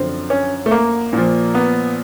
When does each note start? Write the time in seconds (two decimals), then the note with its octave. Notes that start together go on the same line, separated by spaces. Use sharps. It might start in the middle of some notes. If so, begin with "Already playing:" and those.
Already playing: F#2 D3 F3 C4
0.30 C#4
0.66 A3
0.71 A#3
1.13 A#2 F3
1.54 B3